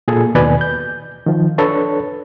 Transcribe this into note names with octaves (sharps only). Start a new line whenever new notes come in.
A#2 G#4 A4
D#2 B2 B4 D5 G#5
G6
D#3 F3
D4 A4 B4 C#5 C#6